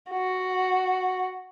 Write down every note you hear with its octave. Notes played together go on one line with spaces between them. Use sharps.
F#4